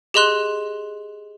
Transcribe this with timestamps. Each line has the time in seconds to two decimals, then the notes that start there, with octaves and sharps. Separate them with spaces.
0.14 G4 G#4 D#5 C6 F#6